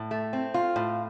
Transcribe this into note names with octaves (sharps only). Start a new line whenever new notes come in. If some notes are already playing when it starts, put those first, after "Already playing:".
Already playing: A2
A3
C4
F4
A2